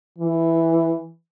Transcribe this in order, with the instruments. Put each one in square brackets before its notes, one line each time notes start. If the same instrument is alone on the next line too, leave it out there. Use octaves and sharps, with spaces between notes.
[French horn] E3